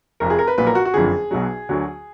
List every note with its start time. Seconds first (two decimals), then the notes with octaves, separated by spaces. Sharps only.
0.20 F1 F2 F3 A#4
0.30 G#4
0.39 A#4
0.47 B4
0.58 B1 A#2 F3 B4
0.67 A#4
0.75 F#4
0.85 F#4
0.94 F#1 F2 D3 F3 G#4
1.31 B1 B2 F#3
1.69 D2 D3 F#3